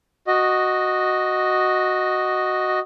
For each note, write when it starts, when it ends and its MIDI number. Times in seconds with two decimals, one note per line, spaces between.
0.27 2.79 66
0.27 2.79 75